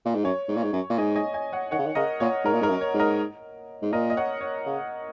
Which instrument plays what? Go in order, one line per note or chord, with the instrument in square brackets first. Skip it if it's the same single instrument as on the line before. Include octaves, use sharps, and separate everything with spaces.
[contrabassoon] A#2
G#2
[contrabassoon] F#2 [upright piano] C#5
[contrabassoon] G#2
A#2
G#2
F#2
A#2
[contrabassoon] G#2 [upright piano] D#5 G#5
[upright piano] D#5 G#5
D#5 G#5
C#5 F#5
[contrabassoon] D#3 [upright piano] C#5 F#5
[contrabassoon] C#3
D#3
[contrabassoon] C#3 [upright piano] A#4 D#5
[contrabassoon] A#2 [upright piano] C#5
[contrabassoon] G#2 [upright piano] A#4
[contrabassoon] A#2
[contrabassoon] G#2 [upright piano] A#4
[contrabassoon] F#2
[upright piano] C#5
[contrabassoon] G#2
[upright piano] A#4 D#5
[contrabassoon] G#2
[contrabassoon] A#2 [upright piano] A#4 D#5
[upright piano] D#5
C#5 F#5
C#5
[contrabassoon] C#3